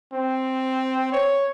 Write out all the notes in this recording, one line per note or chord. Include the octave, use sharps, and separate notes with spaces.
C4
C#5